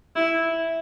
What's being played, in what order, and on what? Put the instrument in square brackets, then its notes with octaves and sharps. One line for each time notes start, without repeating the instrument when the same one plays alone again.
[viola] E4